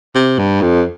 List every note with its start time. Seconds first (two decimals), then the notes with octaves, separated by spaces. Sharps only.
0.15 C3
0.39 G2
0.62 F2